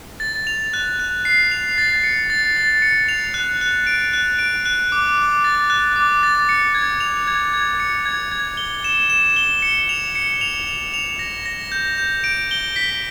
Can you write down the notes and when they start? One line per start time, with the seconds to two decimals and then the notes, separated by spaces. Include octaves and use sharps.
0.20 A6
0.47 F7
0.73 F#6
1.00 F#6
1.25 C7
1.51 F7
1.78 A6
2.03 C#7
2.30 A6
2.57 A6
2.82 C#7
3.09 F7
3.34 F#6
3.61 F#6
3.87 D7
4.13 F#6
4.39 D7
4.65 F#6
4.92 D6
5.18 D6
5.44 A6
5.70 F#6
5.96 D6
6.23 A6
6.49 C#7
6.75 G#6
7.00 F7
7.27 G#6
7.53 G#6
7.80 C#7
8.05 G#6
8.31 G#6
8.57 G7
8.84 E7
9.10 E7
9.36 G7
9.62 C#7
9.89 F7
10.15 C#7
10.41 F7
10.67 F7
10.94 F7
11.19 A#6
11.46 A#6
11.72 G6
11.98 G6
12.24 D7
12.51 G7
12.76 B6